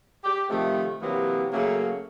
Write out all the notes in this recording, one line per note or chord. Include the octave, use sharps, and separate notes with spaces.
G4
C3 D#3 F3 A3
C3 E3 F#3 A#3 B3
C#3 F#3 A3 A#3